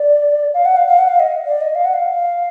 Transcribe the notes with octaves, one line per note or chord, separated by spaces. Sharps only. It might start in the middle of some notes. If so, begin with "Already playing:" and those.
Already playing: D5
F5
F#5
F5
F5
F#5
F5
D#5
D5
D#5
F5
F#5
F5